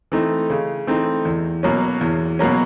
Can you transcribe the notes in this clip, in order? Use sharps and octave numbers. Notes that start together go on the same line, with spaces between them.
E3 A3 C4 D#4
C#3
E3 A3 C4 D#4
E2
B2 F#3 A#3 C#4
E2
B2 F#3 A#3 C#4